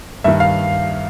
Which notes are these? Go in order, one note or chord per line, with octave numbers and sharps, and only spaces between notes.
G2 D#3 E5
F5